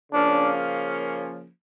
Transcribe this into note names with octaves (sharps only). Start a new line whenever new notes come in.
C#3 F3 A#3 C#4 D4